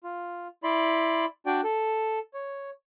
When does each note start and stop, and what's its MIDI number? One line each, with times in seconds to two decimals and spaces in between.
0.04 0.48 65
0.63 1.25 64
0.63 1.25 74
0.63 1.25 83
0.63 1.25 84
1.46 1.61 62
1.46 1.61 66
1.46 1.61 74
1.46 1.61 79
1.64 2.19 69
2.34 2.70 73